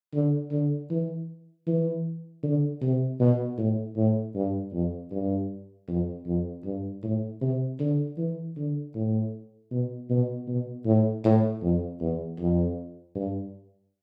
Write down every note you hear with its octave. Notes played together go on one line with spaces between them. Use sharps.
D3
D3
E3
E3
D3
C3
B2
A2
A2
G2
F2
G2
F2
F2
G2
A2
C3
D3
E3
D3
A2
B2
B2
B2
A2
A2
F2
E2
F2
G2